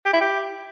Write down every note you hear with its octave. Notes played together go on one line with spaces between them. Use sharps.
G4
E4
G4